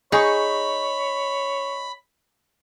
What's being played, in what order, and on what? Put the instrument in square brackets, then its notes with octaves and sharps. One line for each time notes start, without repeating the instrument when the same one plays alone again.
[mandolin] D#4 C#6 [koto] G#4 [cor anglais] C#5 [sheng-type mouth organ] B5